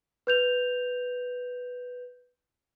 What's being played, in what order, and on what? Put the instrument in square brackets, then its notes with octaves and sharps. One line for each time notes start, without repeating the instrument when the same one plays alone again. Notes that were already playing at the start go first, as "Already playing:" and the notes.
[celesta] B4 G6 F7